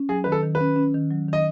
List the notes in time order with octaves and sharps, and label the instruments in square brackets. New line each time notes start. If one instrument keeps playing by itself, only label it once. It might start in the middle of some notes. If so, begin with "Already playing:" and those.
Already playing: [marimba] C#4
[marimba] F#3 [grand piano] G#4
[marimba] D#3 [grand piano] B4
[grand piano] A4
[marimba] D#3
[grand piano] B4
[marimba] C#4
C#4
D#3
F#3
[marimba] D#3 [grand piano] D#5